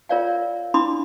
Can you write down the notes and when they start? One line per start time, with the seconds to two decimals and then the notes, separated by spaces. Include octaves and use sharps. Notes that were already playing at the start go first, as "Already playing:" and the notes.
0.09 F4 A#4 C#5 D5 F5 G5
0.74 D4 E4 B5 C6 D6 D#6